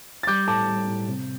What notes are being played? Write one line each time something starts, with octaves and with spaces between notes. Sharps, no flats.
A6
G3 D6 G6
A2 A5 D6
G3
A2
C3